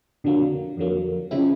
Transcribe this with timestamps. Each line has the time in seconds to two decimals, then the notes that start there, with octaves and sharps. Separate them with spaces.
0.24 F2 D3 F#3 A#3
0.77 F2 D3 F#3 A#3
1.31 C#3 F3 G#3 C4 E4